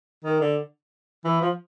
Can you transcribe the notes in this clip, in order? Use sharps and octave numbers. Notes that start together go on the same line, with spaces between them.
D#3
D3
E3
F3